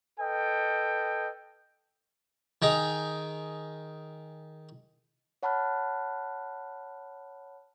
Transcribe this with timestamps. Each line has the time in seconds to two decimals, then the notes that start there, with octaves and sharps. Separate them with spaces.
0.20 A4 B4 D#5 G5
2.62 D#3 D#4 G#4
5.43 C#5 F#5 A5 B5 F6 F#6